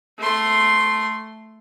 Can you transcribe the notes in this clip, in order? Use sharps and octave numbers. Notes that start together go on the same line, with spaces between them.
A3 C6